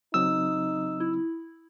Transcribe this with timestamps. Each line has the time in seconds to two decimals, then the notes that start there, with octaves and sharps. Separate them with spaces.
0.14 C#3 F#3 C4 D#4 D#6 E6
1.00 E4